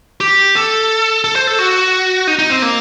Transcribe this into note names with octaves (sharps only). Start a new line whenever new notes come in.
G4
A4
A4
C5
A4
F#4
D#4
D#4
C4
A#3